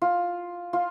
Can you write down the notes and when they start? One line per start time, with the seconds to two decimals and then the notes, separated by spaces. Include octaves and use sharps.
0.02 F4
0.73 F4